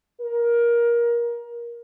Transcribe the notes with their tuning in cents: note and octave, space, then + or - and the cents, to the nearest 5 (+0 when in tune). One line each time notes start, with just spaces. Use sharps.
A#4 +20